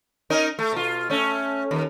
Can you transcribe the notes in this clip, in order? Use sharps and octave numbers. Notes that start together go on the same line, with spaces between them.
C#4 D#4 A#4
A3
B2 F4
A3 C#4
D#2